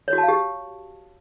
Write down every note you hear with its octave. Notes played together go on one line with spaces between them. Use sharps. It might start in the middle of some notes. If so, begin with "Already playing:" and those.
C#5
F#4
A5
F5
G4